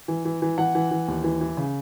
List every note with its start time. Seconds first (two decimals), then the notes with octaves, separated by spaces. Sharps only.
0.08 E3
0.25 E3
0.42 E3
0.58 E3 F#5
0.75 E3
0.91 E3
1.08 D#2
1.24 E3
1.41 E3
1.57 C#3